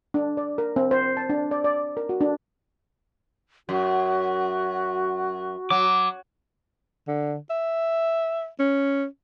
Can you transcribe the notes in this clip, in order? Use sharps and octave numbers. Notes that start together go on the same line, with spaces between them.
D4
D5
A#4
C4
C5
A5
D4
D5
D5
A#4
F#4
D4
F#2 F#4
F#3 D6
D3
E5
C#4